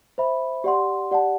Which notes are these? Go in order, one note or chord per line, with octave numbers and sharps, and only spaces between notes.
C5 E5 B5
G4 D5 F#5 C6
G4 D5 F#5 A5